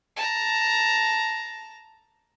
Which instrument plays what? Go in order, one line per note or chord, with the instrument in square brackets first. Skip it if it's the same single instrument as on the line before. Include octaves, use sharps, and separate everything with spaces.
[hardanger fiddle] A5 A#5